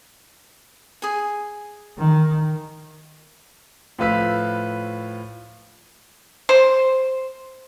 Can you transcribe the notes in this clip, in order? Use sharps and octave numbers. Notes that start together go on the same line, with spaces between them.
G#4 G#5
D#3
A2 F3 F4 B4 E6 B6
C5